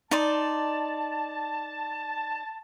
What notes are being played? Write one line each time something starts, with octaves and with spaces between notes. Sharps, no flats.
D#4 D5 A5 C6